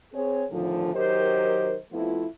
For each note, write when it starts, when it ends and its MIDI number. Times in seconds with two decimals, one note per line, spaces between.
0.13 0.44 60
0.13 0.44 68
0.13 0.44 73
0.51 0.93 40
0.51 0.93 45
0.51 0.93 50
0.51 0.93 51
0.51 0.93 53
0.95 1.76 51
0.95 1.76 54
0.95 1.76 67
0.95 1.76 70
0.95 1.76 72
0.95 1.76 75
1.92 2.25 41
1.92 2.25 53
1.92 2.25 57
1.92 2.25 59
1.92 2.25 64
1.92 2.25 65